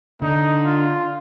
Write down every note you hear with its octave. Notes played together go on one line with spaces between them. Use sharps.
D3 D#4
F4